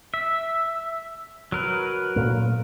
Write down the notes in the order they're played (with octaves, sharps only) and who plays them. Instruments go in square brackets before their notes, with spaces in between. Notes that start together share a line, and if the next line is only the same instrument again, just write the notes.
[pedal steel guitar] E5
F#3 A#4 B4
[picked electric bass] A#2 A3